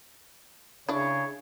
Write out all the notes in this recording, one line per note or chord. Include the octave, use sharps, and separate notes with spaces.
C#3 D4 E4 C#5